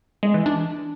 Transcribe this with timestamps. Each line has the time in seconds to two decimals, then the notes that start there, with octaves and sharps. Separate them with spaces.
0.23 G#3
0.34 E3
0.46 D4